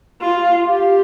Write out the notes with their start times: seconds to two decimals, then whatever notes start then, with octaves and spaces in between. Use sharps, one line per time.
0.21 F4
0.67 G4